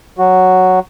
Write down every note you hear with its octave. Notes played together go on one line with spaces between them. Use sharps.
F#3 F#4